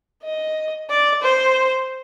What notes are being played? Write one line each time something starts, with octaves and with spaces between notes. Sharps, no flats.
D#5
D5
C5